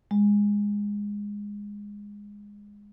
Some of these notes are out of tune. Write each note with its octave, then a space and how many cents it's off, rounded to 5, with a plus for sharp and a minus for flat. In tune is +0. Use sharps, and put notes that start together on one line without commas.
G#3 -15